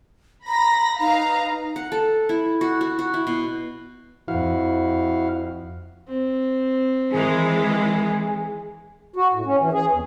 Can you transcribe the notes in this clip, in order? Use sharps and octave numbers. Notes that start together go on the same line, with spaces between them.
A#5 B5 A#6
D#4 B4 F5 A#5
F#5
A4
E4
F#4
F#4
F#4
E4
B2
F2 E4 F#4 F5
C4
D#3 E3 G#3 G#4
F#4
A2
C#4
E3
G#4
E2